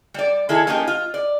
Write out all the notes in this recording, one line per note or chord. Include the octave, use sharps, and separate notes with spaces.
G3 D5
D#3 E4 G#4 A4
F3 A#3 C#4 D#4 G4 A#4
F4
D5